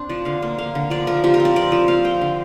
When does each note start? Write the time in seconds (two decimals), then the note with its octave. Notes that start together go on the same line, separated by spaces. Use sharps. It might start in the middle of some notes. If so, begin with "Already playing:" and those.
Already playing: C4 D4 C5
0.09 F3 D5
0.25 D3 F5
0.42 A#3
0.58 A#3 F5
0.75 D3
0.90 F3 D5
1.07 F3 A#4
1.24 F3 G4
1.34 A#4
1.40 C4
1.45 D5
1.56 C4 D5
1.72 F3
1.88 C4 F5
2.04 C4 G5
2.21 D3